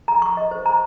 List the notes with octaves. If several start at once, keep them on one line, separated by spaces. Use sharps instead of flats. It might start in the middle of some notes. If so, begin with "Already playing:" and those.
A#5
C#6
D#5
C5
A#5